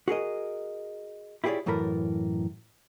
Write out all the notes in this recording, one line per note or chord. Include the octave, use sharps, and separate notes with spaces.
F#4 G#4 A#4 D#5
E4 F4 G4 G#4 C#5 D5
F#2 A2 E3 A4 A#4 B5